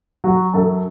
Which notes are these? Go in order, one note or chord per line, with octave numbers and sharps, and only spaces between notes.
F#3 F#4
F#2 A4